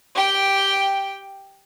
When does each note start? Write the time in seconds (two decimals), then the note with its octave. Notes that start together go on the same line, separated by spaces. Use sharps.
0.15 G4 G5